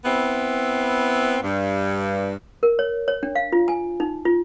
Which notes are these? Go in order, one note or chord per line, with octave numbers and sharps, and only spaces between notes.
B3 C4 E4
G2
A#4
C#5
C#5
D4
F5
F4
G#5
D#4
F4